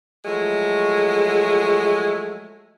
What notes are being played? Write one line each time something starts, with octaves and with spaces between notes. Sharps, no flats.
F3 F#3 G#3 A3